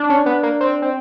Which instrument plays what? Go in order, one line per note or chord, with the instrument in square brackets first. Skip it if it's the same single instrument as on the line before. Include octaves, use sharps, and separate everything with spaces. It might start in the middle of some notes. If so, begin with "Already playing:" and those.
Already playing: [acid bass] D4
[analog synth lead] C#4
B3
A#3
C4
C4